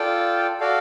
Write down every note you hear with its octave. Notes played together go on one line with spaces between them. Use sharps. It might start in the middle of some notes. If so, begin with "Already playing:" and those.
Already playing: F4 A4 D5 G5
F#4 A4 D5 F5